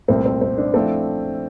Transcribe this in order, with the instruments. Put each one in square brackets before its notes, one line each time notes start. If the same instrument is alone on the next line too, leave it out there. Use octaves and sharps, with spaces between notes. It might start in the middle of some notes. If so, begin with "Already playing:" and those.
[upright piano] C2 A#2 A3 [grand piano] C4
[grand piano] C4
C4
D4
[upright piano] F3 A3 E4 A4 [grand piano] C4